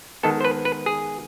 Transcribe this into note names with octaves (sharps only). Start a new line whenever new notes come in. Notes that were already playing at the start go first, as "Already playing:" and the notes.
D#3 G#3 B3 A4
C5
B4
B4
G#4